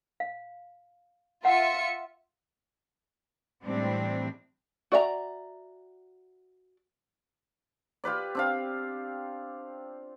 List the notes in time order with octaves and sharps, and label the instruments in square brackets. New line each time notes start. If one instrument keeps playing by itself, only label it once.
[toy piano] F5
[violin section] F4 E5 C#7 [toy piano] F#5
[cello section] A2 E3 G3 G#3 C4 D4
[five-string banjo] F#4 D5 E5 F#5 A#5
[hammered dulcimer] F4 G4 B4 D5
C4 D4 F5